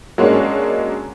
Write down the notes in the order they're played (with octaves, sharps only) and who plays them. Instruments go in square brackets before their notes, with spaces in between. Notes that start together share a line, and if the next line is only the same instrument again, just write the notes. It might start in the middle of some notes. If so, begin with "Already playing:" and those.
[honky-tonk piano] F#3 G#3 A#3 C#4 D4